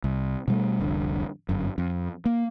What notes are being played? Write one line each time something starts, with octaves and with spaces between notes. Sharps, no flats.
C2
B2 G3 A3
F1 C2 D3
G1 F#2
F2
A#3